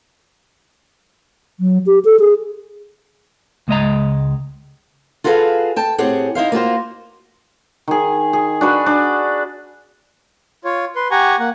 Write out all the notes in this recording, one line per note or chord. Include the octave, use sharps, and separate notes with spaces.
F#3
G4
A4
G#4
C#2 G#3 D#5 A#5
F4 F#4 G#4 A4 B4 F5
G5 A5
A2 C4 G4 G#4 F#5
D#4 E4 C5 F5
A#3 F4 F#4 C5
D#3 G#4
G#4
D4 F#4 B4
D4
F4 C#5
B4 C6
G4 F#5 G#5 A#5 C#6
A#3 F#5